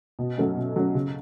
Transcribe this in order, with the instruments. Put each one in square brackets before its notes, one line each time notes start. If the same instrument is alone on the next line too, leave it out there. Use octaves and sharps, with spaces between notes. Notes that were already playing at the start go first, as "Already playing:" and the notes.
[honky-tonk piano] B2
F#3 A3 C#4
B2
F#3 A3 C#4
C#3